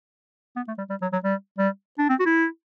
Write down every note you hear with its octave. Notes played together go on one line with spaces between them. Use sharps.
B3
A3
G3
G3
F#3
F#3
G3
G3
D4
C4
F#4
E4